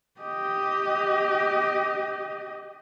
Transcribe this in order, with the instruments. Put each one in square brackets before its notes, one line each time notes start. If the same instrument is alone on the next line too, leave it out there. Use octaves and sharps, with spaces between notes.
[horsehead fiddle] G4 D#5